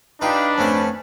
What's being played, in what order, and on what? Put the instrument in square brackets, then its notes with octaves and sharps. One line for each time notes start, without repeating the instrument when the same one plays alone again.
[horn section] D4 [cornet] D#4 [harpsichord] F4 G4 [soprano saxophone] B4
[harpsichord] F2 A3 A5 [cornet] C#4